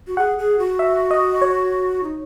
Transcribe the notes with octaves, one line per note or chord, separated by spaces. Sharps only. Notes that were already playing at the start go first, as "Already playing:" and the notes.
F#4
G#4 F#5
G#4
F#4
E5
D#5
C#5
D#4